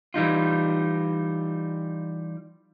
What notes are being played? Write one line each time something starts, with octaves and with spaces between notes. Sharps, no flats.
E3 G3 D#4 F4